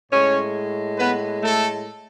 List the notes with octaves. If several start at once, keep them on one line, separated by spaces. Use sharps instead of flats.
A2 G#3 C#4 C#5
B3 B4
A3 A4